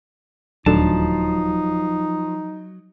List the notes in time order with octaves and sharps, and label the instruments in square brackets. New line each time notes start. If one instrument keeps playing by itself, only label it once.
[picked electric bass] D#1 D2 D3 [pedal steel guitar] F3 A5 [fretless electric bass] F#3 [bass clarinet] D#4